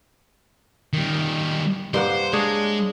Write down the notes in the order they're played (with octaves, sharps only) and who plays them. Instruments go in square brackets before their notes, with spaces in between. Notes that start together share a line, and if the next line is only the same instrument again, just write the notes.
[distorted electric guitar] D#3 G3
[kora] G2 A#3 F#5 [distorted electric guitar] C5
[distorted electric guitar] G#3 [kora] D4 G#4 C#5